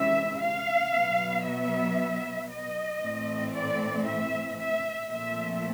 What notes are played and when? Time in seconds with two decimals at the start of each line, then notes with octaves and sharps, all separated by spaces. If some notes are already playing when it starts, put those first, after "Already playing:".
Already playing: C3 E3 G#3 C#4 E5
0.42 F5
0.94 B2 F#3 B3
1.46 E5
2.51 D#5
3.03 A2 E3 A3 C4
3.55 D5
4.07 E5
4.59 E5
5.11 A#2 F3 A3 C4 E5